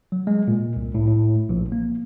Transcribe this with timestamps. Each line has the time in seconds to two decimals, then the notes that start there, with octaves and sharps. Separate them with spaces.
0.12 F#3
0.27 G#3
0.48 A#2
0.76 C2
0.94 A2
1.07 A2
1.49 A#1
1.72 A#3